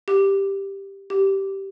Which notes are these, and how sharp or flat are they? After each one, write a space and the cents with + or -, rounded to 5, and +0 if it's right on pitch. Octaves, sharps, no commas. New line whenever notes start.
G4 +5
G4 -10